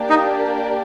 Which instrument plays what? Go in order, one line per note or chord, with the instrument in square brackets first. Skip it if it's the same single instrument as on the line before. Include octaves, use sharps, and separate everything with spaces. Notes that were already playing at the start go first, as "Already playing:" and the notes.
Already playing: [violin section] A#3 D4 G4 A#4 D5
[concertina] D#4